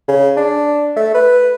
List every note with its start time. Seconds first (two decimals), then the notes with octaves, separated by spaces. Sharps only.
0.08 C#3
0.37 D4
0.96 A3
1.14 B4